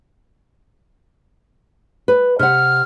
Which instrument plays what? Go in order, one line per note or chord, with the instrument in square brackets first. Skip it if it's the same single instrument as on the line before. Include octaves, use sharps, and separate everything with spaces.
[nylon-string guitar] B4
[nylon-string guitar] C3 F#5 [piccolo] F6